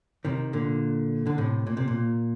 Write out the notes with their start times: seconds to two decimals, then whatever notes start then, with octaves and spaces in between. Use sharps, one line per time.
0.25 C3 D#3
0.53 A#2 D3
1.27 D3
1.38 A2 C3
1.67 A#2
1.77 C3
1.88 A#2